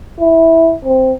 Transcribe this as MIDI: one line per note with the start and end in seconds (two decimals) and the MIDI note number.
0.20 0.75 64
0.85 1.12 60